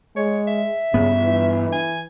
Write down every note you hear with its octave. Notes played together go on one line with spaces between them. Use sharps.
G#3 C#5
E5
G2 C#3 B3
E3
G#5